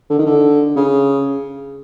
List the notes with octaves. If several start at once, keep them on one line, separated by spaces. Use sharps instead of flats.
D3
D#3
D3
C#3